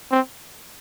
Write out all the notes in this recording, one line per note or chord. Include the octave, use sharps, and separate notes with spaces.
C4